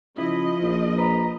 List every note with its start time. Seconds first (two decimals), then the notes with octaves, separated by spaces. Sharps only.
0.18 C#3 F3 E4 D#5
0.62 A#1
0.98 B4 A#5